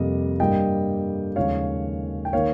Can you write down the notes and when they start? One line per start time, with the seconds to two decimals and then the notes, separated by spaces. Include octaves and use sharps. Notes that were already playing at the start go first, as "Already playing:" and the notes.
Already playing: F2 C3 G3 A#3 D#5
0.40 G2 G3 A#3 D#5 G5
1.36 D#2 C#3 F3 G#3 C#5 F5
2.25 G5
2.33 D#3 A#3 C#5 F5